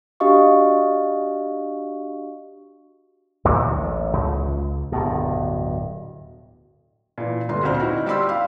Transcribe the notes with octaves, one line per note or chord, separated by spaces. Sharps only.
D4 F#4 G4 D#5 F5 C#6
D2 A#2 E3 F#3
A1
C#2
D1 G2 B2
A#2 E3
G1 D3 C6
D2 A#2 C4 C5 F6
D#4 E4 F#4
G3 G4 D5 B5 C6 E6
F5